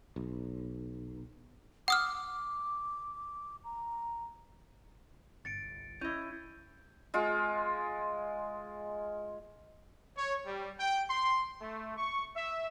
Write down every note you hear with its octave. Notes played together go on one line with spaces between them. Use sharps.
B1
F#5 D6 D#6 F6
A#5
G1 C2 A6 C#7 D7
C#4 E4 D#5 G6 D#7
G#3 F4
C#5
G3
G5
C6
A3
C#6
E5